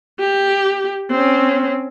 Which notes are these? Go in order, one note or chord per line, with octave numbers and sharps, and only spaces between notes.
G4
C4 C#4